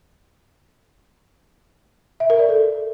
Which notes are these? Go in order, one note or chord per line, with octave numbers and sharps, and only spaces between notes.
E5
A#4
D5
A4